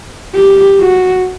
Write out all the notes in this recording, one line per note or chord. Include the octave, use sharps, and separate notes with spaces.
G4
F#4